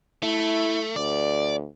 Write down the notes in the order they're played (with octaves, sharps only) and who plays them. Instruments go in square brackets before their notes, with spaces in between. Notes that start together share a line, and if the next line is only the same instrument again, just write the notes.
[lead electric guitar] A3 [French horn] E4
[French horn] D2 [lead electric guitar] D5